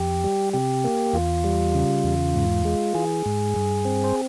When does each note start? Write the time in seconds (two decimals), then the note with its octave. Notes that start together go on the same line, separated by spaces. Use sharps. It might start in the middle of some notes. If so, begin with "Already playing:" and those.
Already playing: F2 G4
0.24 G3
0.53 C3 G4
0.84 A#3
1.13 E2 F4
1.44 G3
1.74 C#3
2.04 E2
2.35 G#2
2.65 G#3
2.95 E3 G#4
3.26 G#2
3.56 G2
3.85 C4
4.04 C5